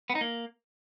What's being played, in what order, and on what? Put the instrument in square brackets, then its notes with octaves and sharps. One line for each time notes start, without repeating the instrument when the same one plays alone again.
[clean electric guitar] B3
D#4
A#3